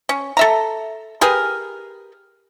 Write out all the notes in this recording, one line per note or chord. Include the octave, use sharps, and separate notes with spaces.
C#4
A4 E5 A#5
G4 G#4 A#4 B4